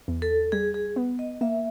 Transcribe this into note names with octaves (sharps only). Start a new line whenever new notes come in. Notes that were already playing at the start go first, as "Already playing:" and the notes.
E2
A4
G3 G#4
G#4
B3
D#5
A#3 E5